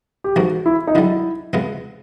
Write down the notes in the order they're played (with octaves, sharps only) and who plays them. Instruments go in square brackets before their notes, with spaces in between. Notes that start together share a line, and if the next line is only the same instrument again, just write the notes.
[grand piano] G4
[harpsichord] A1 G#2 F3 A#3 [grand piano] F#4
[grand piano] E4
D#4
[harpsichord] F#2 D3 G3 [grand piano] E4
[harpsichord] C#2 C3 F3 G#3 B3